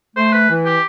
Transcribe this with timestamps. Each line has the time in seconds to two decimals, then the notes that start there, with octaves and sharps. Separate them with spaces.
0.16 A3 C5
0.33 B4
0.49 E3
0.66 G4